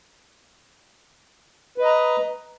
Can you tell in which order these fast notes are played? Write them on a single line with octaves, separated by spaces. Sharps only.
B4 D#5 A#5